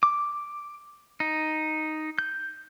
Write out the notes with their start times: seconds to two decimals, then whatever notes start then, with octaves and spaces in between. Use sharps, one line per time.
0.03 D6
1.20 D#4
2.19 G6